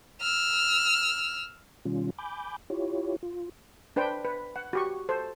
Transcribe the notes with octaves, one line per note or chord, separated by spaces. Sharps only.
E6 F6
B2 D#3 G3 C#4 F4
G#5 B5 D6 G6
E4 F4 G4 C#5
F4
D4 B4 C5 G5
B4
F#5
F#4 G4 C#6
A4 C5